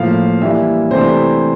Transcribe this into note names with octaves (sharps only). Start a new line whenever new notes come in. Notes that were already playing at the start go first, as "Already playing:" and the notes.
Already playing: A2 F3 A#3 F5
E3 G3 A#3 D4 E5
C3 E3 A3 D4 C5